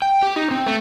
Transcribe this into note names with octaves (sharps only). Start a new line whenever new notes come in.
G5
G4
D#4
C4
A3